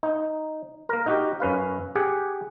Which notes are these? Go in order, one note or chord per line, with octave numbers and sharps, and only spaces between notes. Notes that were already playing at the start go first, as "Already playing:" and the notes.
D#4
A#3 A#4
D#4 F#4 G4
F#2 C#4 B4 F5
G4 G#4 F#5